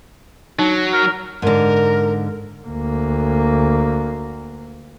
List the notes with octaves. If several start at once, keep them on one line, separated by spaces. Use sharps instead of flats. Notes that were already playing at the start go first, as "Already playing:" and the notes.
F#3 D#4
A#4
G#2 D3 A#4
D2 A#3